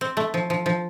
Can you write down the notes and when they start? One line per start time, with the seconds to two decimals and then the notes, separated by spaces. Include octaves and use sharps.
0.01 C4
0.17 A3
0.34 F3
0.50 F3
0.66 F3